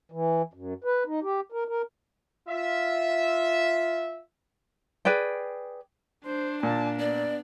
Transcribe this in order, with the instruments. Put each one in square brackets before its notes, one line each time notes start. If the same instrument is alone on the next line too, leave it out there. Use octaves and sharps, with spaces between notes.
[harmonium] E3
F#2
B4
D#4
G4
A#4
A#4
[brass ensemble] F4 E5
[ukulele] G#4 B4 D5 G5
[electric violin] D4 [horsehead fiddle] C5
[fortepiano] A#2 [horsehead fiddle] A5
[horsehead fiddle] B3 [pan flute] D5